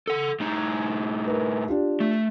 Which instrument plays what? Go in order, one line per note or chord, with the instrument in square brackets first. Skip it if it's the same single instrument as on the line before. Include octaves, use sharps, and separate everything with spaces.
[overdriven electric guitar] A4 F#5
A2 D#4
[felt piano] A#4 B4
D4 F4 G4
[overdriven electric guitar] A3